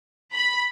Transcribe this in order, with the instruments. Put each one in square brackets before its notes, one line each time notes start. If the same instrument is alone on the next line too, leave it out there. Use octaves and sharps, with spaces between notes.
[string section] B5